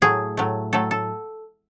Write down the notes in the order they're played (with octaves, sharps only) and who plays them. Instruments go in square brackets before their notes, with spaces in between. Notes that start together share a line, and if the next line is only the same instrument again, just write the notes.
[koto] A2 F#3 A3 G#4
A2 F#3 A3
A2 F#3 A3 A4
A4